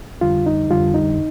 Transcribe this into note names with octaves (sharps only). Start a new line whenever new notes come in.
F2 D3 G3 F4
D#4
F2 D3 G3 F4
D#4